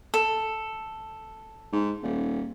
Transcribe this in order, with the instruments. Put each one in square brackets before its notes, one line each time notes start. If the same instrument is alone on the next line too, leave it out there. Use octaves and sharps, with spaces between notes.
[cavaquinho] A4
[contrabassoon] G#2
D#1